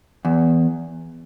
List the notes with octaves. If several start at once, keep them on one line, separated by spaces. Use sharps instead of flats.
E2